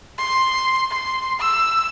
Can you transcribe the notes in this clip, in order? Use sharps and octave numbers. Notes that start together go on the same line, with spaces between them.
C6
C6
E6